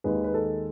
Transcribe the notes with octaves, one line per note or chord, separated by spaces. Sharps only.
D#2 D#3 G#3 B4
B4
A4